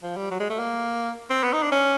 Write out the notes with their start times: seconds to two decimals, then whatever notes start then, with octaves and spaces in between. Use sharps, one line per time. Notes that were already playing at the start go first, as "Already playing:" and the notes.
0.03 F3
0.17 G3
0.31 F#3
0.40 G#3
0.50 A3
0.59 A#3
1.30 C4
1.44 B3
1.53 D#4
1.63 D4
1.72 C#4